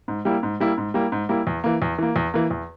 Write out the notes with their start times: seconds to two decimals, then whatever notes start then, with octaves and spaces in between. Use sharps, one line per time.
0.08 G#2
0.25 G3 A#3 E4
0.43 G#2
0.60 G3 A#3 E4
0.78 G#2
0.94 G3 A#3 E4
1.12 G#2
1.29 G3 A#3 E4
1.47 E2
1.64 E3 A#3
1.82 E2
1.98 E3 A#3
2.16 E2
2.34 E3 A#3
2.51 E2